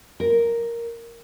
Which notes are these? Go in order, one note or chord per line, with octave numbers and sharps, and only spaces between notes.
A#4